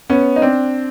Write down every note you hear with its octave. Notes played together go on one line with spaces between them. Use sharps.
B3 C#4
D#4
C4 D4